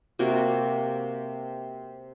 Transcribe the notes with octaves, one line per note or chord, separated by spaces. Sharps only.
C3 A#3 F#4